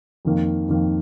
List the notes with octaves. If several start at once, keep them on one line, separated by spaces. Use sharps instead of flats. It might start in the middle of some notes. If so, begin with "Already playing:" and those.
F2 D#3 A#3
F2 D#3 A#3